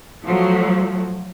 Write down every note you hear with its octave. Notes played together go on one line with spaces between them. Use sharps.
F3 F#3 A3